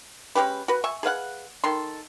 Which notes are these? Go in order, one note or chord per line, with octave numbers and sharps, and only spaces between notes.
G#3 C#4 G4 B4
F#4 B4
E5 G#5 C#6
G#4 B4 F5 F#5
D#3 A4 C6